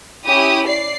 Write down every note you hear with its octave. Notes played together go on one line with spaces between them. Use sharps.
C#4 E4 G4 D#6
D5 C7